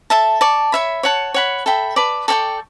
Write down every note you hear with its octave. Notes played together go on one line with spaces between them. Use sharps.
A4 E5 A5
D5 A5 C#6
C#5 E5 B5
C#5 F#5 A5
C#5 F#5 B5
A4 E5 G5 B5
B4 D5 A5 D6
A4 D5 G5 C#6